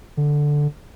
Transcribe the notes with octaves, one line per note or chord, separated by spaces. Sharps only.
D3